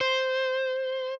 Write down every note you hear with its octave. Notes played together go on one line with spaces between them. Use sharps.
C5